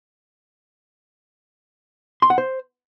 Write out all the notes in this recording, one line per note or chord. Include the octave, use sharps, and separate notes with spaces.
C6
F#5
C5